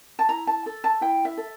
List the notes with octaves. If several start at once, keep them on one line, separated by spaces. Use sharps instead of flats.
A5
E4 A#5
A5
A4
A5
E4 G5
E5
A4